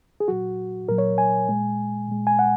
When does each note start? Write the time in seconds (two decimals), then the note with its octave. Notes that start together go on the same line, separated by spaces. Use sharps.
0.20 G#4
0.28 A#2 F#3 F#4
0.89 A#2 F#3 A#4
0.98 C#5
1.18 G#5
1.48 A#2 G#3
2.09 A#2 G#3
2.27 G#5
2.39 F#5